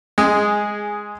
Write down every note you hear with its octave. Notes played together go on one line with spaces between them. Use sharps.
G#3 G#4